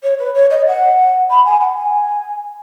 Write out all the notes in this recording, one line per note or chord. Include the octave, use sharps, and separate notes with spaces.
C#5
B4
C#5
D#5
F#5
B5
G#5
F#5
G#5